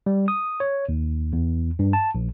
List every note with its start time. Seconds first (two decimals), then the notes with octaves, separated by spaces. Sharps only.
0.06 G3
0.28 D#6
0.60 C#5
0.89 D#2
1.33 E2
1.79 G2
1.93 A5
2.15 A#1